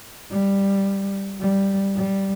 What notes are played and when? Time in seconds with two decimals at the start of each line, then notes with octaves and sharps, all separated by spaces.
0.31 G3
1.40 G3
1.96 G3